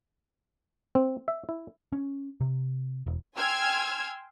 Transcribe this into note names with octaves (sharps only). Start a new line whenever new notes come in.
C4
E5
E4
C#4
C3
E1
G5 G#5 C6 E6 F6 G#6